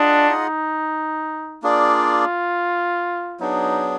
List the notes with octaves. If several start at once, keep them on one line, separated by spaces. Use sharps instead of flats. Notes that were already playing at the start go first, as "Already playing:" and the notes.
Already playing: D4 F4 G#4 D#5 F#5
D#4
A#3 D4 F4 G#4 D5
F#3 B3 D4 D#4 G#4